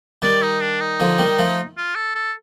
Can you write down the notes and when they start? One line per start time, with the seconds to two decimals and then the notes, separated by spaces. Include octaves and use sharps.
0.22 D#3 G3 D5
0.42 D#4
0.61 D4
0.80 D#4
1.00 D3 F3
1.18 D#3 G3
1.38 F3 A3
1.77 F4
1.95 A4
2.15 A4